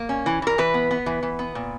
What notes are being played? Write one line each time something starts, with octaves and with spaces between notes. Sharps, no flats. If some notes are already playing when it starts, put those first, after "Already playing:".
Already playing: A#3
C#4
E3
E3 A#4
E3 B4
B3
B3
E3
E3
B3
A#2